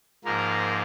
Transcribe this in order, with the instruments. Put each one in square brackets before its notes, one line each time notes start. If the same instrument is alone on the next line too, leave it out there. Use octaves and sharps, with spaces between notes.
[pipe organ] G#2 F3 A#3 A#4